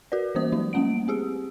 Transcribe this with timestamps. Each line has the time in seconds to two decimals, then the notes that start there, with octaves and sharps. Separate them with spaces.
0.12 F#4 A#4 B4 D5
0.35 E3 G3 A#3 C#4 C5 D#6
0.52 F#3 G#3 D#4
0.73 G3 A3 A#3 C#4 F#5 D7
1.08 C4 G4 G#4